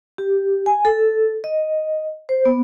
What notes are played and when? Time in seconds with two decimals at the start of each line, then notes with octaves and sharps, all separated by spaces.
0.18 G4
0.66 G#5
0.85 A4
1.44 D#5
2.29 C5
2.45 B3